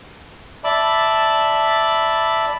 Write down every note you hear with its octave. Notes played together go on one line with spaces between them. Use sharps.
D5 E5 A5 B5